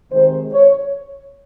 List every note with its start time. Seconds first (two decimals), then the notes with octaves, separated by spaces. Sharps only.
0.12 C3 D#3 G#3 C5
0.53 C#5